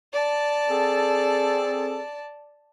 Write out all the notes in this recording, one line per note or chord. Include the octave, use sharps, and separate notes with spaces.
D5 A5
C4 G#4 A4